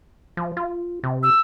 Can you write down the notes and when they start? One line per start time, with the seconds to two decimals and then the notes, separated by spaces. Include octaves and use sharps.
0.37 F3
0.57 F4
1.04 C3
1.23 E6